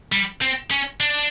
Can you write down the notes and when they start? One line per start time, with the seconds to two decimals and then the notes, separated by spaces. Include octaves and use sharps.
0.12 G3
0.42 C4
0.71 C#4
1.00 D4